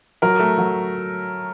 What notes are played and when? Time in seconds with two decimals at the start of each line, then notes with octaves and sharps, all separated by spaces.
0.22 F#3 A#4
0.39 A3
0.58 F#3